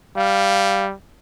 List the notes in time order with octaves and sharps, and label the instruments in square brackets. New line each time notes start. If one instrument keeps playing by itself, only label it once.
[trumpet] G3 [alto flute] F5